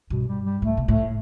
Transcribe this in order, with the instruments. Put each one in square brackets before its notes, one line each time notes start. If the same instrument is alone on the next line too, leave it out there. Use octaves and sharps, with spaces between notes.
[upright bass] G2 [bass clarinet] B2
[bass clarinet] G3
G3
[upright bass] A2 [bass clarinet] A3
[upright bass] B2
[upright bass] A2 [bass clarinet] A3